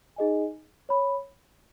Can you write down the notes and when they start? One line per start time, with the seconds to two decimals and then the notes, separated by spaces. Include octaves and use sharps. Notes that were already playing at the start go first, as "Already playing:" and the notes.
0.16 D#4 G#4 D#5 G#5
0.89 C#5 B5